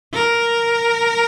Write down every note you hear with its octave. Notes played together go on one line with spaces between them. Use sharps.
A#4